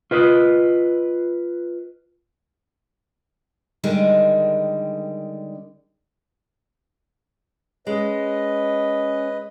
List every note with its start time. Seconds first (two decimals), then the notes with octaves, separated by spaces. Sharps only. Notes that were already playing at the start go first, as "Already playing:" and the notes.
0.11 F4 B4 D#5
3.84 D3 D#3 G3 G#3 D4 A#4
7.87 G#3 C#4 B4 D#5